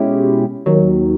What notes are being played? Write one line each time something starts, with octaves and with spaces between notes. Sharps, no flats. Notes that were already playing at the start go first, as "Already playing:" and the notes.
Already playing: B2 G#3 C#4 E4 G4
D#2 D#3 F#3